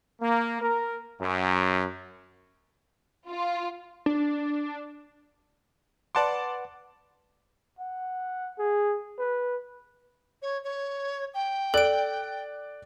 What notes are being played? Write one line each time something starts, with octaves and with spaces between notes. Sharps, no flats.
A#3
A#4
F#2
F4
D4
B4 D5 F#5 A5 C6 D6
F#5
G#4
B4
C#5
C#5
G5
A4 D5 F#6 D7